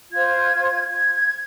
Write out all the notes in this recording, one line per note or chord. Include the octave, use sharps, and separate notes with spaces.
F4 C5 G#6
G#6
G#6